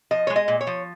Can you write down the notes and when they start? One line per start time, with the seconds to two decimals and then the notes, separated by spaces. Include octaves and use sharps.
0.11 F3 D#5
0.27 G#3 C#5
0.36 D#5
0.48 A#2
0.61 C#5
0.67 F3